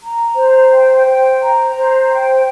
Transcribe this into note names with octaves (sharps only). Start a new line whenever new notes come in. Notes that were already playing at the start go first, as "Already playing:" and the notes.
A#5
C5
G5
C5
A#5
C5
G5